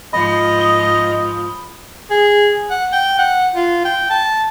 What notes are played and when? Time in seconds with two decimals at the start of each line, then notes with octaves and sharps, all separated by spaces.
0.13 G#2 F3 D#5 B5
0.59 D#6 G7
2.10 G#4
2.70 F#5
2.93 G5
3.19 F#5
3.56 F4
3.85 G5
4.10 A5